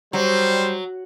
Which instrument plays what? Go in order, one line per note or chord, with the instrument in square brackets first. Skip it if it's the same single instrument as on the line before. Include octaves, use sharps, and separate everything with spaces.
[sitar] F#3 [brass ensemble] G3 C5